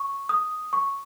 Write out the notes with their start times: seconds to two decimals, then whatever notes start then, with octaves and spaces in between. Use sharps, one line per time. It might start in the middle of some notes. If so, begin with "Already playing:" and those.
Already playing: C#6
0.29 D#6
0.73 C#6